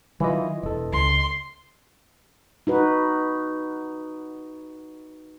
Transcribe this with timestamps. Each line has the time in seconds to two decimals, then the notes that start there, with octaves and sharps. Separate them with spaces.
0.20 D#3 E3 F#3 E4 F4 D#5
0.63 E1 A4 D#5
0.93 C#2 C6
2.67 D#4 F#4 B4